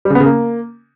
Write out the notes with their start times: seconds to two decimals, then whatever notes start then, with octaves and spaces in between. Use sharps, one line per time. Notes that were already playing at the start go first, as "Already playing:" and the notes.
0.05 G3
0.10 C#3
0.15 B3
0.20 C#3
0.25 A#3